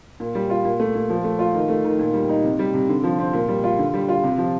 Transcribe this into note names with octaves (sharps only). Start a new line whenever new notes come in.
A#2
G3
F4
A#2
A3
A#2
F3
A3
F4
D#3
A3
D#3
A#2
G3
D#4
C3
G3
C3
D3
F3
C4
A#2
G3
F4
D3
G3
F4
C3
F3